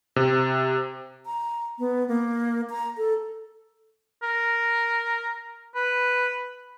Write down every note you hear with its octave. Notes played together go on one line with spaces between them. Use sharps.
C3
A#5
B3
A#3
A#5
A4
A#4
B4